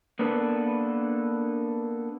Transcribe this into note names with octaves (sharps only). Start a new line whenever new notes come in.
A#3 B3 D4 A4 B4